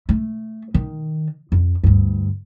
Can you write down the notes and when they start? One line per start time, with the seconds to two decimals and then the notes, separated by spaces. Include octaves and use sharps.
0.09 A3
0.74 D#3
1.52 F2
1.83 D2 G2